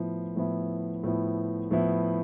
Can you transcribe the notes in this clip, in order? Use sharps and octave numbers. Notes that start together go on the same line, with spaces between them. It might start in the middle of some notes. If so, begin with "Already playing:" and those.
Already playing: A2 F3 B3 E4
A2 F3 B3 E4
A2 F3 B3 E4
A2 F3 B3 E4